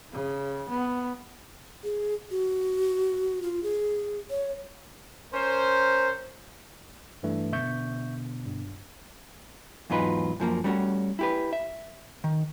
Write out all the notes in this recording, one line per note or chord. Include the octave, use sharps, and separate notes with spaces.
C#3
B3
G#4
F#4
F4
G#4
C#5
C#4 A#4 C5
G2 E3 A3
B2 D3 E5 C#6 G6
G2
E2 G#2 F#3 D#4 F4 B4
F#2 F3 A#3
G3 A3 B3 C#4 F#4
E4 G4 B4
E5
D#3